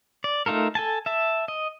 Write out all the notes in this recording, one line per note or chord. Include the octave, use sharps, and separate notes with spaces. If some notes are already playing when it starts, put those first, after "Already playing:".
D5
A3 D#4 F4 A4 A#4
A4 G#5 A5
E5 A5
D#5